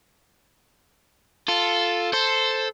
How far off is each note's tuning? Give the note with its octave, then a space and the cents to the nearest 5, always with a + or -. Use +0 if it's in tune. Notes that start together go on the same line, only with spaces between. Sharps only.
F4 +0 A4 +0
A4 +0 C5 +0